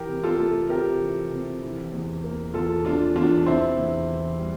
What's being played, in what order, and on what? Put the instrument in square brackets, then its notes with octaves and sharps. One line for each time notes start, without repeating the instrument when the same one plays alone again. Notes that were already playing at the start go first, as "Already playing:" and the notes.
Already playing: [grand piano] E3 G4 A#4
C3
F4 A4
A3
C3 G4 A#4
E3
C3
E3
E2
A#3
E2 F4 A4
E3 D4 F4
E2 D4 F4
D4
C3 C4 E4
E2
E3
G3